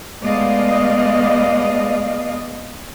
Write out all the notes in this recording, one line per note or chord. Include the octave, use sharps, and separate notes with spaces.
G#3 A3 B3 D5 D#5 F5